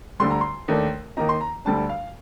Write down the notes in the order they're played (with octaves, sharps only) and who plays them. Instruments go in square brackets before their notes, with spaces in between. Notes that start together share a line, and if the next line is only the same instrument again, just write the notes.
[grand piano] D2 D3 G3 C6
A#5
C6
D#2 D#3 A3 D4
D#2 D#3 A#3 D#4 A#5
C6
A#5
D2 D3 G3 D4 A5
F5